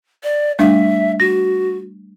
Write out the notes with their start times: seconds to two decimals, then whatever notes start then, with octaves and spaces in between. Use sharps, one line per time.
0.24 D5
0.59 G3 A3 D4 E5
1.20 F#4 A#6